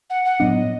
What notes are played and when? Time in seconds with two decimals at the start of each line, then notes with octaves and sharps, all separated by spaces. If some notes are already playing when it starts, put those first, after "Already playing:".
0.10 F#5
0.25 F#5
0.40 A2 F#3 B3 D4 D#5